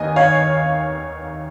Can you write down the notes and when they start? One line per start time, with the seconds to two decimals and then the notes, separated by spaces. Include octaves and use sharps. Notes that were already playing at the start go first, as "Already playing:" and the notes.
Already playing: D#2 D#5 G#5
0.16 C#5 F5